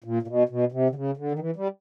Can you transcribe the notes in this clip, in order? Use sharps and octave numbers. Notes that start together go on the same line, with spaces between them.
A#2
A#2
B2
B2
C3
D3
C#3
D3
D#3
E3
G3